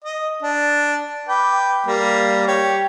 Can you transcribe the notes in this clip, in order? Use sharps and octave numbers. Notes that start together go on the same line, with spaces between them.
D#5
D4
B4 G5 D6
G3 A#3
G4 C#5